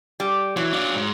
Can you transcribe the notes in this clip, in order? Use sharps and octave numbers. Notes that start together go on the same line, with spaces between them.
G3
E3 F#3
D4 F4
G#2